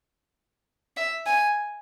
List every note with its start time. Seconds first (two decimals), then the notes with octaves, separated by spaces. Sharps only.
0.97 E5
1.26 G#5